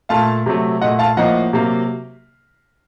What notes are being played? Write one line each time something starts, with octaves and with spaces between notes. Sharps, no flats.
A#2 A3 F5 A5
C3 F#3 A3
A#2 A3 D#5 F#5
F5 A5
A2 F3 A#3 D#5 F#5
C3 F#3 A#3